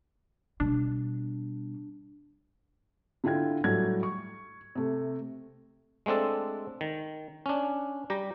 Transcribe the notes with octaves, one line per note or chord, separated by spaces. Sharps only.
B2 G3 D4
D3 E4 F4 G5 G#6
A2 F#3 G3 A3 G#6
C#6
C3 A3
G#3 A3 C4 D4 A4
D#3
C#4 D4
G3 G4 A#5